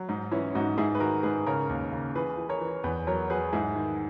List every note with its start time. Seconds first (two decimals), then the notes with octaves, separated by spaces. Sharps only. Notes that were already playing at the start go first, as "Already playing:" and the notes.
Already playing: F#3
0.09 G#2 D#4
0.31 E3 C#4 E4
0.55 G#2 D#4 F#4
0.78 G#2 E4 G#4
0.95 B4
1.00 D#3 F#4 A#4
1.23 G#2 G#4 B4
1.46 C#3 A#4 C#5
1.69 D#2
1.93 C#3
2.15 E3 G#4 B4
2.38 E3
2.49 A#4 C#5
2.61 E3
2.84 E2 G#4 B4
3.07 F#3 A#4 C#5
3.30 F#3 G#4 B4
3.53 G#2 E4 G#4
3.76 D#3